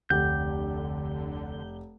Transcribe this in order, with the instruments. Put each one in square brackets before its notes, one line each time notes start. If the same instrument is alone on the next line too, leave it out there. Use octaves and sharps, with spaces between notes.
[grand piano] F1 G4 F#5 [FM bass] D2 [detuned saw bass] D3 [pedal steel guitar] G6